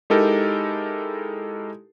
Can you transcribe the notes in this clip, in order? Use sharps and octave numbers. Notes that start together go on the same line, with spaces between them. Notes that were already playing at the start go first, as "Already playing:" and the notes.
G#3 D#4 E4 G4 A4 A#4